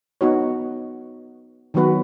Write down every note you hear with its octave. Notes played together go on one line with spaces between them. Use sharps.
B3 D#4 F#4 C#5
D#3 F#3 B3 F#4 B4